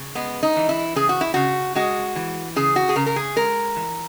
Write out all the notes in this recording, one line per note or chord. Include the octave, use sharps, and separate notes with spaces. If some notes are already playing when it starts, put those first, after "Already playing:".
Already playing: C#3
G#3 B3
D#4
E3
E4
C#3 G#4
F#4
E4
C#3 F#4
G#3 F#4
E3
C#3 G#4
F#4
G#4
C#3 A#4
A#4
G#4
G#3 A#4
E3